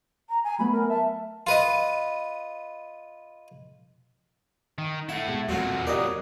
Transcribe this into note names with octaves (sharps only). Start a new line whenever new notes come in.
A#5
G#5
F#3 A3 B3 B5
A#4
E5 A5
F4 B4 D#5
D#3
A3 E4 F#5
B2 G#3
E2 A#2 F#3 A3 C4 F#4
F#4 G4 A#4 D5 D#5